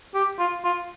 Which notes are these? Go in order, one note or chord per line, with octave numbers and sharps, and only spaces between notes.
G4
F4
F4